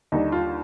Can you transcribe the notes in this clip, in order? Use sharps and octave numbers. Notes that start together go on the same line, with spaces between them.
D#2 D3 G3 D4 D#4
F4